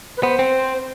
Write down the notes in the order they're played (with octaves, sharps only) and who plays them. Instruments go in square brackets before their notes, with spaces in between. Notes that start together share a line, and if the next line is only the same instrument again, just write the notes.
[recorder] B4
[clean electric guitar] B3 [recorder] C5
[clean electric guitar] C4